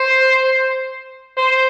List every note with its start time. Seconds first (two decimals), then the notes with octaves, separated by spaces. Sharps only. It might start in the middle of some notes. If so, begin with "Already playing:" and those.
Already playing: C5
1.38 C5